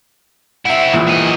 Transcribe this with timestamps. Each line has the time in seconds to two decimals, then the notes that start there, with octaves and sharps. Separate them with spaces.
0.65 C4 E4 E5 F#5
0.93 A#1 A#2 E3
1.07 F#3 D#5